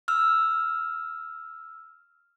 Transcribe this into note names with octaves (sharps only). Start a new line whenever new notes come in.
E6 F6